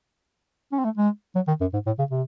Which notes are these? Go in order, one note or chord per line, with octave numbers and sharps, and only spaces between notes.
C#4
C4
A3
G#3
F#3
D#3
F#2
G#2
A2
C#3
C3